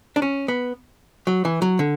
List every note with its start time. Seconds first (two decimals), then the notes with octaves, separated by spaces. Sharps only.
0.16 D4
0.22 C#4
0.48 B3
1.27 F#3
1.45 E3
1.62 F#3
1.79 D3